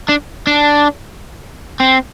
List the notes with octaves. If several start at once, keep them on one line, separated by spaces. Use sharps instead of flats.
D4
D4
C4